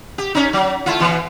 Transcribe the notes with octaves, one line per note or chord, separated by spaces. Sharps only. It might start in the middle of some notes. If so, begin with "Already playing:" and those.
G4
C#4 D#4
F#3
A3 E4 F4
B2 E3